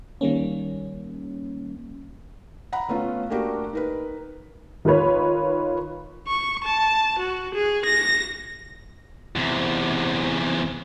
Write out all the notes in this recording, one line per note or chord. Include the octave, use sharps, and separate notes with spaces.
D#3 G3 A#3 C#4
F#5 A#5 B5
A3 B3 C#4 F4
A3 A#3 D4 F#4 G4 A#4
D#4 A#4 B4
D#3 F4 A#4 B4 C#5
C#6
A5
F#4
G#4
A#6
E2 C3